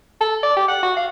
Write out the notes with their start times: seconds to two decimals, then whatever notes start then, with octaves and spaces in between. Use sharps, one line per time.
0.21 A4
0.43 D5
0.56 G4
0.68 F#5
0.83 F#4
0.97 F5